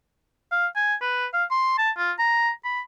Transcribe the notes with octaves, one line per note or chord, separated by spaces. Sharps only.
F5
G#5
B4
F5
C6
A5
F4
A#5
B5